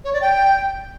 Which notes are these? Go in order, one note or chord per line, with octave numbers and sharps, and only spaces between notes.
C#5
D5
G5